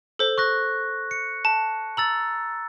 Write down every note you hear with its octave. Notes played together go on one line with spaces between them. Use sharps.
A4 C5
C#6 F#6 A#6
C#7
A5
A#5 E6 A6 F#7